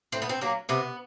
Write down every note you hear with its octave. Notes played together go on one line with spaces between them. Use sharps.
A2 C4
B3
C4
F#3 A#3
C3 B3